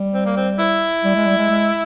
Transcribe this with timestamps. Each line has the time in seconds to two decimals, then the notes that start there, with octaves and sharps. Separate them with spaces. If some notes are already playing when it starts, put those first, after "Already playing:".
Already playing: G3
0.14 C4
0.26 A#3
0.37 C4
0.59 E4
1.04 G3
1.16 G#3
1.26 G3
1.38 G#3
1.50 G#3